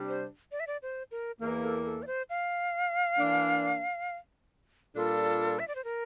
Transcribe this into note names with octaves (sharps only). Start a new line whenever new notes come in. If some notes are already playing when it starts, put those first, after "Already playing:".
Already playing: C3 G3 D4
C5
D5
E5
D5
C5
A#4
E2 E3 A#3 A#4
A4
A4
D5
C5
F5
E3 A#3 D4
A#2 G3 D4 F4 A4
E5
D5
C5
A#4